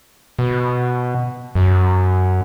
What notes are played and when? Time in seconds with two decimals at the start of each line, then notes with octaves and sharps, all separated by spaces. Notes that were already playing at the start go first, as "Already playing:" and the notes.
0.39 B2
1.55 F#2